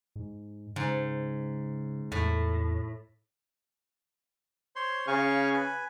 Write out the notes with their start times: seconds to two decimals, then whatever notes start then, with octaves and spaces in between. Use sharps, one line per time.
0.16 G#2
0.76 G#2 C#3
2.12 E2 A2
4.76 C5 C#5 C6
5.07 C#3 F5 G#5 C#6
5.54 B4 G#5